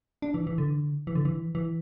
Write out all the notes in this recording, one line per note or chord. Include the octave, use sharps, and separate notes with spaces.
D4
E3
E3
D3
E3
D3
E3
E3